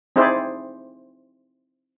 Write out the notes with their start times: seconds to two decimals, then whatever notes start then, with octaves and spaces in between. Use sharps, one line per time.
0.16 C4 D#4 E4 G#4 C5 D5